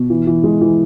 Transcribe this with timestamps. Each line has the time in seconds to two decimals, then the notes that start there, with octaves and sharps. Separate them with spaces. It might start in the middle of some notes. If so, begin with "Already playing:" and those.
Already playing: B2
0.10 E3
0.27 E3
0.44 G#3
0.61 E3